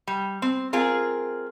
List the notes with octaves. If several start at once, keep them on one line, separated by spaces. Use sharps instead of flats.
G3
C4
C4 F4 G#4 A#4